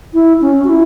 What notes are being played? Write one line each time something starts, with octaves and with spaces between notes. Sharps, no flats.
E4
C#4
F#4
E4